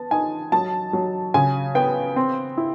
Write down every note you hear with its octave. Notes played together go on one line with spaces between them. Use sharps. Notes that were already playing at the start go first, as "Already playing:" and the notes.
Already playing: B3 A5
D#4 G#5
F#3 A5
F#3
C#3 G#5
B3 G5
C4
E4